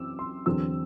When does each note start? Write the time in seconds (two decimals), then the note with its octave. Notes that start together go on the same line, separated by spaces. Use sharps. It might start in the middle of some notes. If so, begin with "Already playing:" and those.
Already playing: F#2 E3 C4 D6 E6
0.19 C6
0.46 E2 D3 F#3 C4 E6